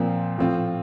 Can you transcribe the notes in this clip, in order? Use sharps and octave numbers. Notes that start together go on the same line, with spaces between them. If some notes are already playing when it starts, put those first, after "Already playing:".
Already playing: A#2 F3 C4
A2 F3 C4 F4